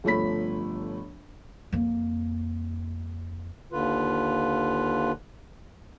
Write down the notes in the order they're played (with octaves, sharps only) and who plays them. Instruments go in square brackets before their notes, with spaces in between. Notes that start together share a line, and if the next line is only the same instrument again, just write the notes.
[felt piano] G1 F3 A3 C#5 B5 B6
[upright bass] F2 A#3
[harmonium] D#2 D3 F4 B4